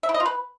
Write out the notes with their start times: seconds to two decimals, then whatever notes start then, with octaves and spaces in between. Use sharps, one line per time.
0.03 E5
0.09 E4
0.14 D#5
0.20 F4
0.26 B4